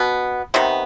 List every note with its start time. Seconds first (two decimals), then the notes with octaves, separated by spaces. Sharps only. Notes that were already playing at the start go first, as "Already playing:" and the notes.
Already playing: B2 B3
0.54 C3 D#3 B3